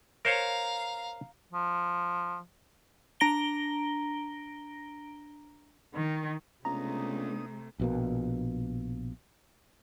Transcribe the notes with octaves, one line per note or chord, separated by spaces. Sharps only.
A#4 C5 C#5 F5 A#5
F3
D4 A#5 A#6 D7 G7
D#3
C#2 C3 A3 B3 D4 A#5 D#6
A#1 B2 A#3